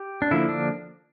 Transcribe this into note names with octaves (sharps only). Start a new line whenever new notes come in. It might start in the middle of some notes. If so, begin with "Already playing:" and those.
Already playing: G4
D4
D3 F3 A#3 E4
D4